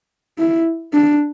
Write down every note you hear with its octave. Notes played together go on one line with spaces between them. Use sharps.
E4
D4